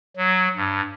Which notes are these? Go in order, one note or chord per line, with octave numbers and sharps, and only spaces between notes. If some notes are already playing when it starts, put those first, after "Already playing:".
F#3
G2